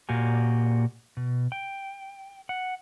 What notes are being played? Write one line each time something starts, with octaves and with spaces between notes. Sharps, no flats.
A#2 A#3 F#4 G4 G#5
B2
G5
F#5